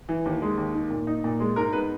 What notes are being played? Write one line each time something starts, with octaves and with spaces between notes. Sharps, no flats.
E3
D#2
G#3
D#2
D#3
A#2
D#4
A#2
G#3
G#2 A#4
B3 B4